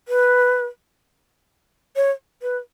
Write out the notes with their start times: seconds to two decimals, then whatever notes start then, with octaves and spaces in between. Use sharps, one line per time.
0.08 B4
1.96 C#5
2.42 B4